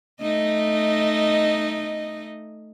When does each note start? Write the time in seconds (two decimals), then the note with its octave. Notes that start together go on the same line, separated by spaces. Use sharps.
0.21 A3 D#4 D#5